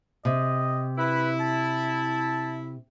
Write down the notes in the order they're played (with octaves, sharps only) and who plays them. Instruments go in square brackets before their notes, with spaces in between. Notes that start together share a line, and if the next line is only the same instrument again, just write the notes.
[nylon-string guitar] C3 [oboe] D#5
[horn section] E4 [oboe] B4
[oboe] A5